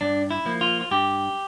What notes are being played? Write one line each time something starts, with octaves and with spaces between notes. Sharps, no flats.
G2 D4
E4
F3 A#3
F4
F4
G2 G4